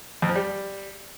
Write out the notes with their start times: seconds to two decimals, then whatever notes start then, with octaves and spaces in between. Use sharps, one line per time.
0.22 F2
0.29 F3
0.35 G3